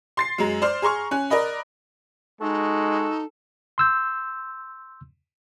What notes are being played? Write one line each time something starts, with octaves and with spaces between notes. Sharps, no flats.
C6 A6 C7
F#2 G#3 A#5
C5 D5 C6 F6
G#4 A#5 C6 C#6 F6
C#4 F#6
A#4 D5 D#5 B5
G#3 D#4 F#4 A4
C6 E6 G6